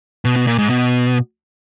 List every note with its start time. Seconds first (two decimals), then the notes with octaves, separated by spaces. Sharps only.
0.25 B2
0.36 B2
0.47 A#2
0.58 G#2
0.70 B2